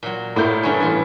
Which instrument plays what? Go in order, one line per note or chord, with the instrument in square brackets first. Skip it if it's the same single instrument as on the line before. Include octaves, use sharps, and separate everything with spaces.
[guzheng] A#2 F#3
[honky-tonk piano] A2 E4 G6 [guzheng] A#3 F4
[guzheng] G2 D3 C#4
E2 F4